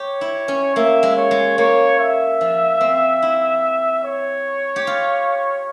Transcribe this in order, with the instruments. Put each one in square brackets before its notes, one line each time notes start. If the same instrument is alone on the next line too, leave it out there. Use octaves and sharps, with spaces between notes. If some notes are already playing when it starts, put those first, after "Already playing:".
Already playing: [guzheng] G4 [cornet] C#5
[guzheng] E4
C#4
[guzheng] A#3 [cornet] E5
[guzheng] G#3
[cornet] C#5
[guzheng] G#3
[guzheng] A#3 [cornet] C#5
[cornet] E5
[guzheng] F3
C4
E4
[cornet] C#5
[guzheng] G4
F4